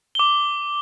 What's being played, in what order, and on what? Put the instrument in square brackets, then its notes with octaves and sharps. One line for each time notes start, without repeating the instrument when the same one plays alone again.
[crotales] D6 G7